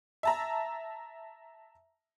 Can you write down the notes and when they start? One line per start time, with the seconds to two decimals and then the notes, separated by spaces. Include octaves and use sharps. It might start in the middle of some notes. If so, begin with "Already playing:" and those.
0.23 E5 A5 A#5